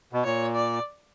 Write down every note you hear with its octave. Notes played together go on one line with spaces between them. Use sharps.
B2
A#2 C#5
D5